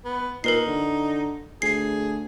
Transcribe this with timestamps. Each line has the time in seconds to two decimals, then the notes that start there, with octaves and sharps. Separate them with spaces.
0.05 B3
0.44 A#2 D#4 A#4 B4 C7
0.67 D3
1.62 D2 G#4 C7